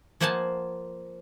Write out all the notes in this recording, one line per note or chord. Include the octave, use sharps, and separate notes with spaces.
F3 A#3 C5 F#5 G#5 A5